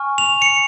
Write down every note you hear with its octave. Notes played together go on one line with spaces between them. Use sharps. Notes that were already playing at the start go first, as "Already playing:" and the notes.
Already playing: G#5 C#6 F6
F7
C#7 F7